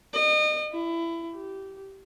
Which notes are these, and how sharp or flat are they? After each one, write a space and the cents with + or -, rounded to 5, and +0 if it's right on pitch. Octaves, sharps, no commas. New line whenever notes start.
D#5 -35
E4 +20
G4 -15